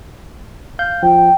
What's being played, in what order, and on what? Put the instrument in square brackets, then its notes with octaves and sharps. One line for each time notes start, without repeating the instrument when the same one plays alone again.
[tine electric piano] F5 G6
[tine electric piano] F3 [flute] G5